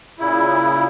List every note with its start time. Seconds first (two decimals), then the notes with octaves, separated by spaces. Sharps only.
0.19 A#2 C#3 E4